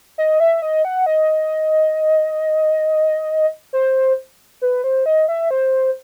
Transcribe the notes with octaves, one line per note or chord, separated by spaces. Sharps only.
D#5
E5
D#5
F#5
D#5
C5
B4
C5
D#5
E5
C5